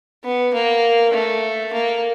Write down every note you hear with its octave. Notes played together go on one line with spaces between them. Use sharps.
B3
A#3
A3
A#3